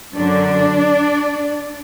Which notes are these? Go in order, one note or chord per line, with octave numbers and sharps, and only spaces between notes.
F#2 D3 F#3 D4 D5